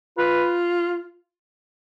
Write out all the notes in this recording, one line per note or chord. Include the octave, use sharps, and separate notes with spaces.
F4 B4